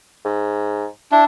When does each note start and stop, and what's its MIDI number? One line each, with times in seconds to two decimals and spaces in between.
0.25 0.86 44
1.12 1.25 62
1.12 1.23 64